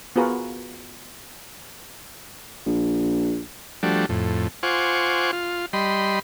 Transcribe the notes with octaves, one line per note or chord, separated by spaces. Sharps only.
B3 F4 F#4 G#4 A#4 B4
A#1
F3 G3 A3 D4 F#4
F2 A2
F4 C5 F#5 G#5 C#6 D6
F4
G3 D#5 B5 C6